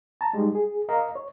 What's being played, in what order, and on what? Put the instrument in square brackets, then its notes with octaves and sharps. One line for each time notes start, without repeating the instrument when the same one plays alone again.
[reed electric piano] A5 A#5
G3 G#3 D#4 G4
G#4
A#4 D#5 F5 A#5
C#5